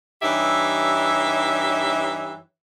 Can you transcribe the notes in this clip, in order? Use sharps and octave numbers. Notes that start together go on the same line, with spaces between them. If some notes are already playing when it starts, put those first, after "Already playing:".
G2 E3 D#4 G4 C#5 E5